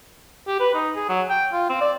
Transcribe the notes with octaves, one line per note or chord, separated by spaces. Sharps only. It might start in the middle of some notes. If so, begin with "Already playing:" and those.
G4
B4
D#4
G#4
F#3
G5
F4
C4
D5